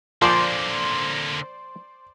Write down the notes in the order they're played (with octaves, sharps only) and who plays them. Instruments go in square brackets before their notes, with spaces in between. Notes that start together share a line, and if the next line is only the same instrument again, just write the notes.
[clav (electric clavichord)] A#2 F3 [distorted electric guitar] D3 A#3 [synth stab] C5 D5 [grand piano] C6